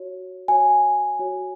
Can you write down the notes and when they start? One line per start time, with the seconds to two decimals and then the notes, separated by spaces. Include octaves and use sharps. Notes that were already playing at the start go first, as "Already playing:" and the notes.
Already playing: F#4 C#5
0.48 F#4 C#5 G#5
1.19 F#4 C#5